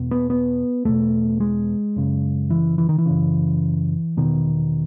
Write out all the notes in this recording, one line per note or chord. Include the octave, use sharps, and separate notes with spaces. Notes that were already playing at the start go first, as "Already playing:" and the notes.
Already playing: E2 B2
B3
B3
E2 B2 A3
G#3
F#2 C#3
E3
E3
D#3
E3
F#2 C#3
E2 B2 D#3